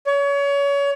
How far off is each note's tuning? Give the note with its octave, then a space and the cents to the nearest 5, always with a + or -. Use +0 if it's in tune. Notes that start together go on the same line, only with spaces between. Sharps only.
C#5 +30